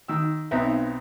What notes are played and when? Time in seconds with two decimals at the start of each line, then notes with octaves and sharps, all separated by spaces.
0.08 D#3 E6
0.51 B1 B3 C4 D#4 B4 E5